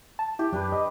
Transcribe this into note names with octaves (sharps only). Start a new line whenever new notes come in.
A5
E4 G4
F#2 D4 G4 B4
D#5